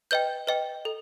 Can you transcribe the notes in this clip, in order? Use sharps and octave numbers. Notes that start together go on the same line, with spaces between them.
B4 D#5 G5 G6
B4 D#5 G5
A4